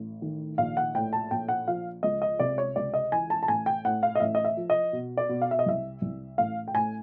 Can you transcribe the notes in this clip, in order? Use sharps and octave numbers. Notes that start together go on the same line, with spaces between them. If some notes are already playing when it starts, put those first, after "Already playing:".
Already playing: A1
D#3
A#1 F5
F#5
A2 G5
A5
A#1 G5
F#5
F3 F5
C#2 D#5
D#5
C3 D5
C#5
C#2 D5
D#5
E3 G#5
A5
A5
A1 G#5
G5
A2 F#5
F5
D#5
A1 E5
D#5
E5
F3
D#5
B2
D5
B2
F5
E5
D#5
C2 E5
C2
A1 F5
G5
A2 G#5